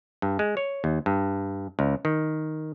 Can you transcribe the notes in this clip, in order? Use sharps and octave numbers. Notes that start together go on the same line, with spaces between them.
G2
G#3
C#5
D#2
G2
C#2
D#3